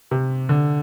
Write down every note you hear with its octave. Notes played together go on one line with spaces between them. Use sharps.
C3
D3